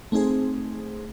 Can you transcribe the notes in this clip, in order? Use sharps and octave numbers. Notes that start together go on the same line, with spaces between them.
A3 C4 D#4 G#4 C5